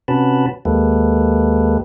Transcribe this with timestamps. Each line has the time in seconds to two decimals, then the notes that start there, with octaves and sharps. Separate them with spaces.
0.08 C3 C#4 F#4 B4 A5 B5
0.65 D#2 G#3 A#3 G4 A4 B4